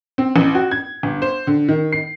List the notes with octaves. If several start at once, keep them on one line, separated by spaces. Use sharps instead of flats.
C4
A1
F#4
G#6
G1
C5
D3
D#3
C7